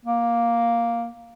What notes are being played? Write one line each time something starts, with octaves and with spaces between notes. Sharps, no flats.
A#3